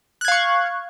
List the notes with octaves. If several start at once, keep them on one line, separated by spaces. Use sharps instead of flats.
F5 C#6 F#6 G#6